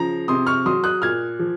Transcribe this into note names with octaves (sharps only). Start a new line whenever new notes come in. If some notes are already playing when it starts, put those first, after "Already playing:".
Already playing: C#3 F3 A#5
C3 C6 D#6
C#6 F6
F#3 C6 D#6
D#6 F#6
A#2 F6 G#6
F3